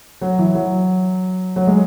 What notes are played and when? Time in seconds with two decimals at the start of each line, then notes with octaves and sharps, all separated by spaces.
0.21 F#3
0.39 E3
0.55 F#3
1.56 F#3
1.67 G#3